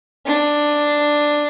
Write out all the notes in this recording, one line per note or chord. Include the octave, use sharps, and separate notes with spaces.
D4